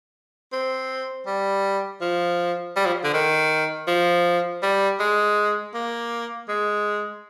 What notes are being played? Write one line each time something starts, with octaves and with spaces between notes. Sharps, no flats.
C4
G3
F3
G3
F3
D3
D#3
F3
G3
G#3
A#3
G#3